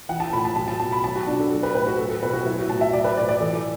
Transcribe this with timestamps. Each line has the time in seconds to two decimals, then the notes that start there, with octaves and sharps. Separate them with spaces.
0.09 E3 F#5
0.20 A5
0.33 A2 B5
0.45 A5
0.56 F#3 A5
0.68 A5
0.80 B2 A5
0.92 B5
1.04 F#3 A5
1.16 F#4
1.27 B2 D4
1.40 A4
1.51 F#3 A4
1.63 B4
1.74 A2 B4
1.87 F#4
1.98 F#3 A4
2.10 A4
2.22 B2 B4
2.33 F#4
2.45 F#3 E4
2.58 F#4
2.70 A2 A5
2.81 E5
2.93 F#3 D5
3.04 B4
3.17 A2 D5
3.29 D5
3.40 E3 A4